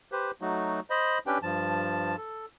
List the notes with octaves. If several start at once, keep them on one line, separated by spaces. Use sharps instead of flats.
G4 B4 C5
F#3 A3 D#4 F#4
C5 D#5 B5
C#4 D4 G4 B4 G5
G2 F3 A5
A4